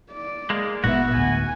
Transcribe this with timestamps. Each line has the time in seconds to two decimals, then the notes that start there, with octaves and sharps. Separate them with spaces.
0.12 D5
0.50 G#3 A#3
0.84 G#1 A#2 G#3 B3 F#4 E5
1.15 D2 A2 G#5